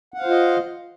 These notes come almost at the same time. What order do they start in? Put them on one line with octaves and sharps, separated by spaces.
F#5 F5 C5 F4 D#5